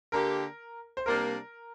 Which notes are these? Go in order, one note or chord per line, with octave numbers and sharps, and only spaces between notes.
D3 A#3 G4 A#4
C5
C3 G3 A#3 D4 A#4